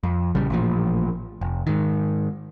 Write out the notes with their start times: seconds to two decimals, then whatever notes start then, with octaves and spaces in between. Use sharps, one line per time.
0.03 F2
0.35 A#1 C#3 G3
0.50 A1 A#2 F3
1.41 F1
1.67 G#2 D#3